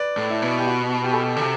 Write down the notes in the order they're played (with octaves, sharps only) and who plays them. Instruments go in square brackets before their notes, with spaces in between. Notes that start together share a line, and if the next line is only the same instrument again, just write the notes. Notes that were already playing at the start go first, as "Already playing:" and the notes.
Already playing: [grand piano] B4 D5
[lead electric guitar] A2
[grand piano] E4
[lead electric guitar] B2
[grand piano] G4
F#4
G4
A4
G4
[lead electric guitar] D3
[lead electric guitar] C3 [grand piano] A4